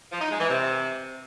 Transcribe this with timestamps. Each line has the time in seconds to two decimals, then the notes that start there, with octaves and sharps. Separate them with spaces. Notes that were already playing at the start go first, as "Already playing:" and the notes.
0.12 F3
0.21 D#4
0.30 G#3
0.39 E3
0.49 C3